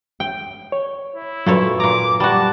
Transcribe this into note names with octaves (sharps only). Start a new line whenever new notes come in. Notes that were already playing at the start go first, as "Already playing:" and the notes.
G5
C#5
E4
A#2 F#3 A4 B4 C#5
A#2 A#5 D6
G3 F#4 A5